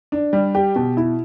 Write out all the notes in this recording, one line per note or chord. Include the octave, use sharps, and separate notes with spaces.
D4
G3
G4
B2
E4